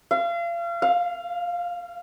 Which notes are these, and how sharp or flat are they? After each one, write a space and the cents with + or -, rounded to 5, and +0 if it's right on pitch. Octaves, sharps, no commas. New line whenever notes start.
F5 -35
F5 +10